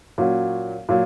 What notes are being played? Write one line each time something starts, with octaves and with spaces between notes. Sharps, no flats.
A#2 F#3 C#4 F#4
A#2 F#3